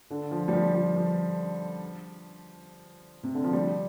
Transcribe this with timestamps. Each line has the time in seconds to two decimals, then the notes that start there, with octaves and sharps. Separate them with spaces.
0.10 D3
0.31 F3
0.48 G3
0.53 F3
0.74 F3
0.96 F3
3.23 C3
3.34 D3
3.44 F3
3.53 G3